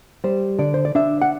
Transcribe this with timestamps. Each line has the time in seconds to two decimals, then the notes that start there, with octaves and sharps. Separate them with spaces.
0.24 G3 C5
0.59 D3 D5
0.74 C5
0.85 D5
0.95 D4 E5
1.22 F#5